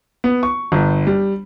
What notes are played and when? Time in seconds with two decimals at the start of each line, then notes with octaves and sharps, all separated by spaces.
0.24 B3
0.43 C#6
0.72 G1
1.07 G3